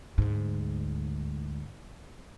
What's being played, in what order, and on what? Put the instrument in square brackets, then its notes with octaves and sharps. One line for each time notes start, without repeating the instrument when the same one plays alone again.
[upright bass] D2 G#2